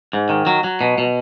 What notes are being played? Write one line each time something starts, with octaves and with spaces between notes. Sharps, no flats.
G#2
D#3
F#3
F#3
B2
B2